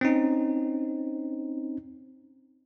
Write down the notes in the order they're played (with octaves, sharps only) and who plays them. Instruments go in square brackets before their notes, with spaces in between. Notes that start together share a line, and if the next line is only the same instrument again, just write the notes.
[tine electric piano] C4 C#4 D#4